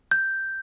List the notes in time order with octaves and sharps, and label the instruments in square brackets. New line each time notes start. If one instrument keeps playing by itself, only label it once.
[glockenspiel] G6